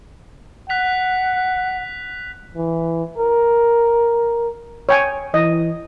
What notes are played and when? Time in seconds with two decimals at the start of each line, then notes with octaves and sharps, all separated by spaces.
0.69 F#5 F#6 B6 F7
2.55 E3
3.18 A#4
4.89 C#5 G5 G#5
5.34 E3 D#5